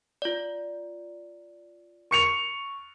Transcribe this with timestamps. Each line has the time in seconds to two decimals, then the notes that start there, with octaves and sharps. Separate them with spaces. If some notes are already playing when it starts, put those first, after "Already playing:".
0.22 F4 D5
2.11 C#6 C#7 F7